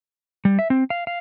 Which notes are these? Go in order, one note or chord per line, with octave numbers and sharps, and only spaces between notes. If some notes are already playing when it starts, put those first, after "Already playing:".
G3
E5
C4
F5
F5